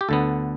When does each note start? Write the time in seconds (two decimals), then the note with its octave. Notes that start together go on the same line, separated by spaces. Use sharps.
0.01 G4
0.09 D2 D3 B3 A4